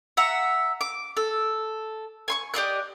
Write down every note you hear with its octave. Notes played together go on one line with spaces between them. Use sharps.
E5 F#5 A#5
D6
A4
G#5 C6 C#6
G4 D5 D#5 F#6